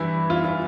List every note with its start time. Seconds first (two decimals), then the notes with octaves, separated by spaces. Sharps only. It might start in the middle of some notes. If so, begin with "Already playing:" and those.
Already playing: G2 E3 E4
0.30 F4
0.44 F4